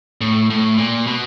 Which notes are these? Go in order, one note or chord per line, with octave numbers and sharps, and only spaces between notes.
A2
A2
A#2
B2